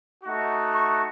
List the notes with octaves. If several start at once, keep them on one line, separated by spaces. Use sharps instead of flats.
A3 D#4 F#4
C#6